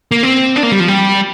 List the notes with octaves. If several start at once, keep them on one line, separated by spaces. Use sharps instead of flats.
A#3
C4
D4
A#3
G3
F3
G3